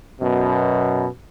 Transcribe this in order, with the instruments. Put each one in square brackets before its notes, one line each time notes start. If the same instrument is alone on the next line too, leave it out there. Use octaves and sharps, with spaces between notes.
[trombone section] F#2 B2